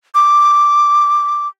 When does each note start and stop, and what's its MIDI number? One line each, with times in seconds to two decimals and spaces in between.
0.15 1.47 86